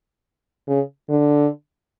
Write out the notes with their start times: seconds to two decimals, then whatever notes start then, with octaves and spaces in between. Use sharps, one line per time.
0.67 C#3
1.09 D3